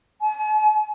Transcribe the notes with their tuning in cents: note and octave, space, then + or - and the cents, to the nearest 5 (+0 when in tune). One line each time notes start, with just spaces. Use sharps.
G#5 +45